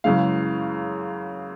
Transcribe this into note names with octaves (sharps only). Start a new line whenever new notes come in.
F#2 C#3 E3 G#3 F5